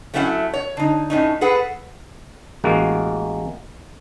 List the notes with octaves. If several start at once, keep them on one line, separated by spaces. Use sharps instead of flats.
F#3 A3 C#4 E4 F5 F#5
C#5
D3 D#4
A2 C#4 D#4
G#4 A4 B4 F#5
A1 G#3 A#3 F#4